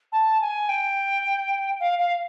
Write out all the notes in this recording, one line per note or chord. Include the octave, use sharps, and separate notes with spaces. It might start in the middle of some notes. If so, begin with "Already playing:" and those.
A5
G#5
G5
F5
F5